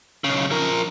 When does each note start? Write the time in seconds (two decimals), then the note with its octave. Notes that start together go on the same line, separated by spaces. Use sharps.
0.24 B1 C#3
0.51 F3 A#4